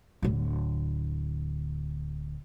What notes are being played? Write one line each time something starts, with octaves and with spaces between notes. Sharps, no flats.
D1 D3